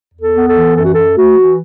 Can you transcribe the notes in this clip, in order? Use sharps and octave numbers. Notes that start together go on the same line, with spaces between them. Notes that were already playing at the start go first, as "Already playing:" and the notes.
E2
A4
B3
A4
E3
F#2 A4
F#4
F#2 A4
A3 F#4
E3